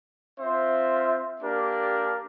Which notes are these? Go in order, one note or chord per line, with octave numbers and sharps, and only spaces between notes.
C4 F4 C5 E5
A#3 D4 G4 A#4 D5